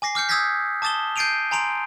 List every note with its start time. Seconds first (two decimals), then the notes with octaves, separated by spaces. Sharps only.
0.02 G#5 D6 A#6 C7
0.15 D6 F6 G6 C#7
0.29 D#6 E6 G6 G#6 A#6 B6
0.82 A5 D6 D#6 A6 E7 G7
1.16 G6 A6 C7 D7 D#7 F7
1.51 G#5 A#5 C6 D7 F7